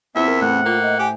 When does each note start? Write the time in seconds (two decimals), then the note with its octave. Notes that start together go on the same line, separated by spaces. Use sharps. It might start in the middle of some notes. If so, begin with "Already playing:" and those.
0.15 E2 C4 E4 F4 C5 E5
0.28 A#4
0.41 A2 F#5
0.66 A#3 F4
0.82 D#5
0.99 G4 G#5